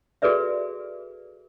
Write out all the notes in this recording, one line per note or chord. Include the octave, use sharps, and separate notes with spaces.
F#4 G#4 A4 B4 D5 E5